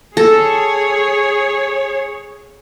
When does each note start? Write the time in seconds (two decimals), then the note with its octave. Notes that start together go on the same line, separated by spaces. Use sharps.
0.17 G#4 A4 C#5